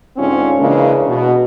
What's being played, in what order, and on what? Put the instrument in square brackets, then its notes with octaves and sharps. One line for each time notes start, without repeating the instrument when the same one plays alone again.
[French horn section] G#2 D3 C4 C#4 F4
C#3 E3 G#3 A#3 D4
B2